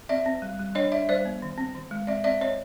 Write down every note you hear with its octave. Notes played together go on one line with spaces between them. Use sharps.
C4 D5 E5
C4
G3
G3
D4 C#5 D#5
D4 D5 E5
G3 C5 D5
B3
D#3
C4
D#3
G#3
C4 D5 E5
C4 D5 E5
C4 C#5 D#5